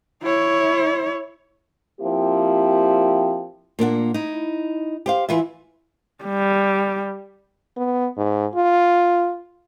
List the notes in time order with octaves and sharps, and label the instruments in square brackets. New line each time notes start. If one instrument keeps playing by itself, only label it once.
[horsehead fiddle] E4 C#5
[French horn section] F3 A#3 C4 E4 G4
[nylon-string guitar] A#2 A#3 D4 F#5
D#4 E4
G4 C5 F5
E3 F4 B4 E5
[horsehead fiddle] G3
[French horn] B3
G#2
F4